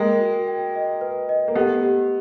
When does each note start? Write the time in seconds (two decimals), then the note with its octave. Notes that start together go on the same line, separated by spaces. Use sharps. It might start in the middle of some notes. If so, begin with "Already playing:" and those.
Already playing: G#3 A#3 G5
0.20 F#4
0.48 G5
0.75 D#5
1.01 B4
1.29 D#5
1.48 A#3
1.55 A3 B3 G4
1.83 G4